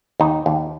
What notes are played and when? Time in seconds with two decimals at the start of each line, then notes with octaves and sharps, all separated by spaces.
0.20 D#2 D#4
0.46 D#2